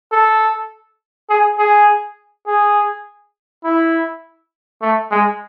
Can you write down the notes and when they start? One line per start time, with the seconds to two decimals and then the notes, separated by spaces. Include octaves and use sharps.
0.12 A4
1.29 G#4
1.58 G#4
2.47 G#4
3.64 E4
4.82 A3
5.11 G#3